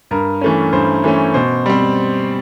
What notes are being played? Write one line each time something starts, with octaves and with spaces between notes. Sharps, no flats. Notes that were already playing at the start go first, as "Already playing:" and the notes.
G2 A#4
E3 A3 C#4
G2 C5
E3 A3 C#4
B2 C5
G3 C4